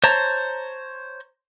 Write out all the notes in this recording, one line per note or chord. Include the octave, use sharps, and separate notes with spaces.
C5 C#5 A5 A#5